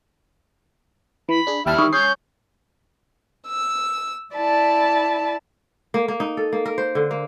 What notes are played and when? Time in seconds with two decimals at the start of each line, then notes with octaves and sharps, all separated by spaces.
1.29 E3 B5
1.47 D4 G#4
1.66 D#2 G3 E4 E5 G5 A5 F6
1.79 D#3 C#6 D#6
1.93 C#4 C#5 D#6 G6 C7
3.48 E6
4.35 E4 D5 A5 B5
5.94 A#3
6.08 A#3
6.20 D#4
6.37 A4
6.53 A#3
6.66 A#4
6.78 C5
6.95 D3
7.11 A#3